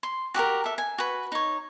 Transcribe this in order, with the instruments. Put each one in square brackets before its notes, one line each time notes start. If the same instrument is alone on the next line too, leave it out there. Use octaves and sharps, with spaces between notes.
[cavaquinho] C6
F#4 G4 A4 A#4
A4 E5
G#5
F#4 B4
D#4 C#5